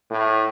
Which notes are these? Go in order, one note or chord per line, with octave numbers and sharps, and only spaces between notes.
A2